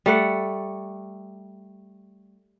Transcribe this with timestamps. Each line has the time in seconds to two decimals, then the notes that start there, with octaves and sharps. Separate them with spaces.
0.06 G3 A3 F#5